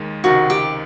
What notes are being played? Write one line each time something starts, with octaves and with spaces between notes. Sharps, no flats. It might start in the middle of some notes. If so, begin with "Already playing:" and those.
Already playing: D#2 D#3 G#3
C#2 C3 D#3 F#4
G4